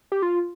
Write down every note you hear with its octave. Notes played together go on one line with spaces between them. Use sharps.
G4
F4